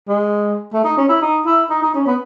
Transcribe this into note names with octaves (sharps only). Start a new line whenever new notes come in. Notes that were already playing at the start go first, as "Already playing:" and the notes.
G#3
A3
D#4
C#4
E4
D#4
E4
D#4
D#4
C#4
B3